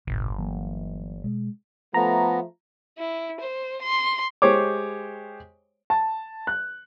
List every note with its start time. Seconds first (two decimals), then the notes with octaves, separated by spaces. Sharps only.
0.07 G1 C2 A2
0.39 E3 F#3 A#3
1.24 B2 G#3
1.94 F3 A3 B3 A#5
2.98 E4
3.40 C5
3.82 C6
4.42 G#3 G4 C5 C#5 D6
5.90 A5
6.47 F#6